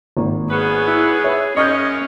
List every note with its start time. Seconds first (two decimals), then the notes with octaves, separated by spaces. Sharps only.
0.17 G#1 A#3
0.51 B3 C#4 G#4 B4
0.87 E4
1.24 C#5 E5
1.57 F#2 C#3 C#4 C#5 D#5 C#6 F6 G6